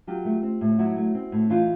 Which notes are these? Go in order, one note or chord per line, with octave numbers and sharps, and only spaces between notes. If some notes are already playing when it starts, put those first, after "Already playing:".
F#3 F4 G4
A3
C4
A2
F#3 E4 F#4
A3
C4
A2
E3 D#4 F4